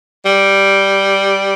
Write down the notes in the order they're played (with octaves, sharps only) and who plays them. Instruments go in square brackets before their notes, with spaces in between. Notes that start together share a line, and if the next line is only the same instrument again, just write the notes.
[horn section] G3